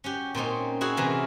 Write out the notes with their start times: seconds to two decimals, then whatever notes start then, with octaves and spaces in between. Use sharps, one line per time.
0.04 C#4 F#4 G4
0.35 A#2 C4 C#4 D#4
0.81 E4 F#4 G#4 C#5
0.97 C3 E3 A#4